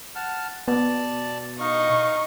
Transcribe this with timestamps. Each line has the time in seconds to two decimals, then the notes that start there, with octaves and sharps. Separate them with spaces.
0.16 F#5 A5 F6
0.68 B2 D5 A5
1.60 D#4 D#5 F5 C#6